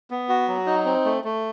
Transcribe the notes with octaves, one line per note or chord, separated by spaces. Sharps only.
B3
F#4
F#3
D#4
C4
A3
A3